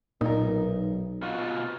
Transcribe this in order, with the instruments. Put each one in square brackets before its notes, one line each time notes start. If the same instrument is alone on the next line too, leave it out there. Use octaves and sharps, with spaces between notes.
[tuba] B1 [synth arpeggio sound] A#2 [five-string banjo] D#4 A#4
[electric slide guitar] B2 F4 F#4